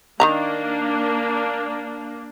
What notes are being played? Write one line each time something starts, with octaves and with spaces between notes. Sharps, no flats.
D#3 E3 A#3 D4 A#5